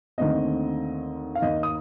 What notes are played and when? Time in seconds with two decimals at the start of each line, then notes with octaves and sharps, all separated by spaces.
0.18 D#2 D3 A3 C4 D#5
1.35 F5
1.42 D#2 D#3 A#3 D#5
1.63 D#6